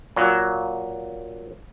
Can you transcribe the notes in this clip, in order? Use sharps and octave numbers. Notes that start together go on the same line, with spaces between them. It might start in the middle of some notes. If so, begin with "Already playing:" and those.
A#2 F#3